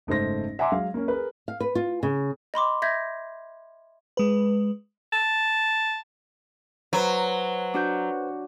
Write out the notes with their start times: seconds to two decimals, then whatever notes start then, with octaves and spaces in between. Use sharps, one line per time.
0.07 F#1 G#2 A3 C5 A#6
0.59 E5 F#5 G#5 A#5 C6 D6
0.72 F#3 G#3 F5
0.94 A#3 C#4
1.08 G#4 A#4 B4
1.48 F5
1.60 B4
1.75 F4
2.03 C#3
2.54 D#5 B5 C6 D6
2.82 E5 G6 G#6 A#6
4.17 G#3 B4
5.13 A5
6.93 F#3 B4 C5 A#5
7.74 D4 F#4 G6